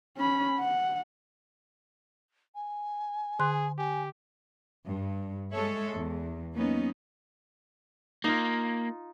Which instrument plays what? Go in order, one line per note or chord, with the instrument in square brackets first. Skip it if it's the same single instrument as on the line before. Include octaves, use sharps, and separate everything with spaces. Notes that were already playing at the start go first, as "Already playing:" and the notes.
[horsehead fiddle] C#4 B5
F#5
[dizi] G#5
[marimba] D3 C6 F#6 [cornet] G#4
[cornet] G4 [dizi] G#5
[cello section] G2
G#3 A4 C#5 E5
E2
F#3 A#3 B3 C#4 D#4
[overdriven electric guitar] A#3 [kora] D#4 F4